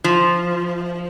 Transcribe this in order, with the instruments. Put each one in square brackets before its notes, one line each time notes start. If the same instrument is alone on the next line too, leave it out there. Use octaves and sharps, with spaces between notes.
[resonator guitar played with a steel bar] F3